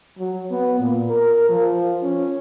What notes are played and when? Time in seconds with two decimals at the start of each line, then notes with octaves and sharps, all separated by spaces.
0.19 F#3
0.51 B3
0.80 A#2
1.10 A#4
1.49 F3
2.03 C#4